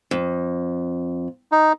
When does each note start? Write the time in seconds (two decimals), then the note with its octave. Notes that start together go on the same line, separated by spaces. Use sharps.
0.11 F2
1.52 D#4